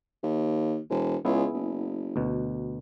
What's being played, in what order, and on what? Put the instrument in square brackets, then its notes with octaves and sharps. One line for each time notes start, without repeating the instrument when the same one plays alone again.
[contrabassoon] D#2
E1
[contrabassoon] C#2 [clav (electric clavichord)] B3 E4 G#4
[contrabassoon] F#1
[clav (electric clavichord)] D2 B2